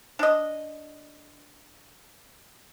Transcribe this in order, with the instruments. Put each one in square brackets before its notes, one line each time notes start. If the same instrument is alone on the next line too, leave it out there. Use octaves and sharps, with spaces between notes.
[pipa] D4 D#5